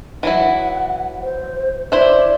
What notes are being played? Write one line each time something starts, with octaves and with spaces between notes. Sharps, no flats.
E3 F#3 E4 F#5
C5
E4 C5 D5 E5